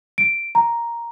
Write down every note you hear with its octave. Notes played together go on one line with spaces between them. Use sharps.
D7
A#5